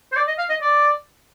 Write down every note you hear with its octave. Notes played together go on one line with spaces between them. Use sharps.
C5
D5
D#5
F5
D#5
D5